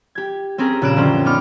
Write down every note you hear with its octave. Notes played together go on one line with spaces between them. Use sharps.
G4 G#6
C4 C#4 G4 G#4 A#4
A#1 C#3 F#6 D7 E7
F#2 D3 C#4 C5 G5
B3 D#4 D6 F6